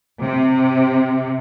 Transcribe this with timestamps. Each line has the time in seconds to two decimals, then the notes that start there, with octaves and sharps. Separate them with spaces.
0.22 C3